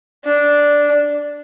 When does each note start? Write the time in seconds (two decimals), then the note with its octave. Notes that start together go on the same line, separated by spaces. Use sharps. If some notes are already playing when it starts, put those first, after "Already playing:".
0.24 D4